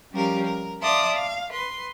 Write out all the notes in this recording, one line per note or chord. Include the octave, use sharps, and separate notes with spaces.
F3 G3 C#4 G4 A#4 F5
A#4
D5 E5 F5 A5 C6 D#6
F5
B4 C6